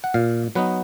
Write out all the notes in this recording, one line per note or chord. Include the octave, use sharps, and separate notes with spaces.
F#5
A#2 F5
F#3 B3 D#4 B4